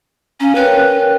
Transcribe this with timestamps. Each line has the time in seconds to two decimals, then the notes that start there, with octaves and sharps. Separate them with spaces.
0.40 C#4 F5 A#5
0.55 A#4 B4 C#5 G5